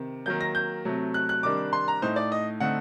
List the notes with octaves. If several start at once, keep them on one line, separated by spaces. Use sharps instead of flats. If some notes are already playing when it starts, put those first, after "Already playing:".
Already playing: C3 D#3
D#3 F#3 A#3 G6
A#6
G6
C3 F#3 A3
F#6
F#6
C3 D#3 G3 D4 D6
C6
A#5
A2 A3 D#4 C5
D5
D#5
D3 A3 C4 D#4 F#5